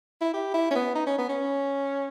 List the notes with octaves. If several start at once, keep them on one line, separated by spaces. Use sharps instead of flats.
E4
G4
E4
C#4
B3
D#4
C#4
B3
C#4